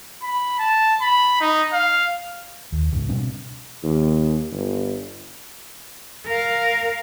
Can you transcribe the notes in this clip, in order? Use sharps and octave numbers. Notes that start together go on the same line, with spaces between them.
B5
A5
B5
D#4
F5
D#2
C#2 G#2
B2 G3 C4 D4
D#2
G1
A#4 F5